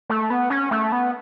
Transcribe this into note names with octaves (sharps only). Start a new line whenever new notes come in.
A3
B3
C#4
A3
B3